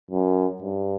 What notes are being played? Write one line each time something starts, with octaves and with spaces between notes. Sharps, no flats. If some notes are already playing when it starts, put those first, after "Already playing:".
F#2
G2